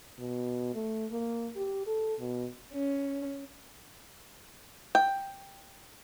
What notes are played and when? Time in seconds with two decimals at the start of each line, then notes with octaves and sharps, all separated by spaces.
0.19 B2
0.74 A3
1.11 A#3
1.56 G4
1.86 A4
2.20 B2
2.72 C#4
4.95 G5